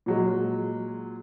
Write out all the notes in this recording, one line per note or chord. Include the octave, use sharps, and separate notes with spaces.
A#2 F#3 G#3